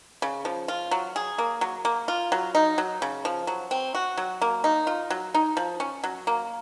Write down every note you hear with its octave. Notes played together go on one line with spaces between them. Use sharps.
C#3
F3
F4
F#3
G#4
A#3
F#3
A#3
F4
F#3
D#4
F#3
C#3
F3
F#3
C4
F#4
F#3
A#3
D#4
F4
F#3
D#4
F3
C#4
F#3
A#3